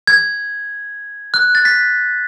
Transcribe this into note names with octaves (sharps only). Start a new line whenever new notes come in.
G#6
F#6
A6
B6